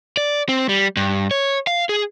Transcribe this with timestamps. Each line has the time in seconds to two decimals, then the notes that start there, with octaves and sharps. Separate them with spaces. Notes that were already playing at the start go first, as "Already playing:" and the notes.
0.17 D5
0.49 C4
0.69 G3
0.97 G2
1.31 C#5
1.67 F5
1.89 G#4